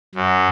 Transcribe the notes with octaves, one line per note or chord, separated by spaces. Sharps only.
F#2